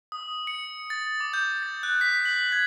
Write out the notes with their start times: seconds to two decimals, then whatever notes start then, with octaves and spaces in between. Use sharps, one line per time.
0.12 D#6
0.47 C#7
0.90 A6
1.20 D6
1.33 G6
1.63 A6
1.83 F#6
2.01 B6
2.25 F#7
2.52 G#6